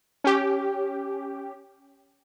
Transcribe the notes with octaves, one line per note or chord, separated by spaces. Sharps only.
C#4 G4